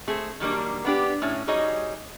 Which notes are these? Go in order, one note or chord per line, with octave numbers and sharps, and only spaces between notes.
A3 C4 G#4
D#3 F#3 G3 A#3 D4
B3 D4 G4
A2 C#4
G3 D#4 F#4 G#4 C#5 D#5